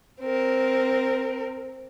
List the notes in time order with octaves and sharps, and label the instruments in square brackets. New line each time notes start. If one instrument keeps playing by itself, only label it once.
[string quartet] C4 A#4